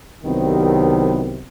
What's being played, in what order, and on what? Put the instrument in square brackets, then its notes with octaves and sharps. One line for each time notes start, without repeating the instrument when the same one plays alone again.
[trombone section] C2 C3 D#3 F#3 B3